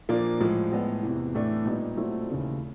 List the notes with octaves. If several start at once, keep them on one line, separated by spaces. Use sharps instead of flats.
A#2 F3 A#3 D4
A2 F3 G#3
A2 E3 G#3 B3
E2 C3 E3
A2 E3 A3 D4
A#2 G3 B3 D#4
A#2 F#3 A3 C4 E4
D#2 C#3 E3 A3